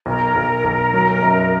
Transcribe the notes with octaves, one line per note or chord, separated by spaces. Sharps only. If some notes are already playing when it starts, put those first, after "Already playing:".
B1 A#4
B1
B1
F#3
F#2